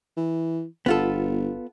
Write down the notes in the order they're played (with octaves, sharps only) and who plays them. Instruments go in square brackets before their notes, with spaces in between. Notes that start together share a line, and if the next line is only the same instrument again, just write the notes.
[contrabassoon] E3
[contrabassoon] G1 [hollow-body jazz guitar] B3 F4 A4